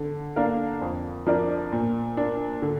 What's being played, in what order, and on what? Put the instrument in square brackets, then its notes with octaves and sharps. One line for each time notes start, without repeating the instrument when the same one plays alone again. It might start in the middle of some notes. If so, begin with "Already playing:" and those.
Already playing: [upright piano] D3
A#3 D4 A#4 F5
F2
F3 D4 A#4 D5
A#2
A#3 D4
D3